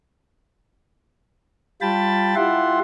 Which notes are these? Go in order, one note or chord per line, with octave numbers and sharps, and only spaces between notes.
G3 F4 G5 A5 B5 A6
E4 F4 G4 E5 F#5 C6